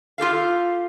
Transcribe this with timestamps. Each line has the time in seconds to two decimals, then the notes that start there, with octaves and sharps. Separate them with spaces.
0.18 F4 G4 A4 F5